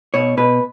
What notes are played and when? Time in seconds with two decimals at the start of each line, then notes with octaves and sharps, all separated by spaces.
0.14 B2 C#5
0.37 B2 B4